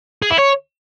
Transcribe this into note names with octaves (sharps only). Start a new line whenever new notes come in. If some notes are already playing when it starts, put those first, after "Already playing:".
G#4
E4
C#5